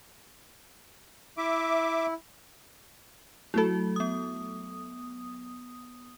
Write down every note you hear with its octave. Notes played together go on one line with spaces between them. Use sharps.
E4 E5 D6
F#3 A3 E4 F#4 A4
B3 D#6